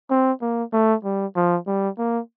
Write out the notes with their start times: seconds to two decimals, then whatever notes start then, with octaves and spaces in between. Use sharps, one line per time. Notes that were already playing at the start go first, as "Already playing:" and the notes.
0.10 C4
0.41 A#3
0.73 A3
1.04 G3
1.36 F3
1.67 G3
1.98 A#3